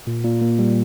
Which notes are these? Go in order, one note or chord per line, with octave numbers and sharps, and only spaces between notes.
A#2
A#2
A#3
G3